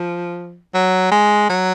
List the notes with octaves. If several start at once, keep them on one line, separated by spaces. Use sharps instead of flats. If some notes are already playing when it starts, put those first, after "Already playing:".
Already playing: F3
F#3
G#3
F#3